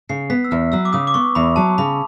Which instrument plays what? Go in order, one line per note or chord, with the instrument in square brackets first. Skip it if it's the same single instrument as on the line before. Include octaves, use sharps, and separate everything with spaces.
[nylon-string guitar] C#3 [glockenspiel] C7
[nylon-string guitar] B3 [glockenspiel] B6
[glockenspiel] E6
[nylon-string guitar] E2 [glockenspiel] F6
[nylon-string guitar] F#3 [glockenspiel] E6
[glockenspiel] D6
[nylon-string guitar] C#3 [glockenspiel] D#6
[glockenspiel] D6
[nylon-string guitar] B3 [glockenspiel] C#6
[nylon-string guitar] E2 [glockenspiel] B5
[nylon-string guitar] F#3 [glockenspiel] A5
[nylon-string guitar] C#3 [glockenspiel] B5